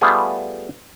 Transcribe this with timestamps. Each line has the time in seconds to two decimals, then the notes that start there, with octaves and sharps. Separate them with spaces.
0.01 G3 A3 B3 F4 G#4